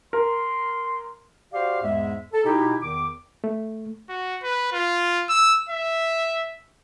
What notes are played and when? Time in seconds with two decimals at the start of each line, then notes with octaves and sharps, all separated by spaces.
0.13 A#4 C6
1.53 F#4 G4 C5 D5 F5
1.82 E2 G#2 G#3 E5
2.33 A4
2.45 B2 D#4 E4 G4
2.82 E2 D#3 D6
3.44 A3
4.09 F#4
4.43 B4
4.72 F4
5.29 E6
5.69 E5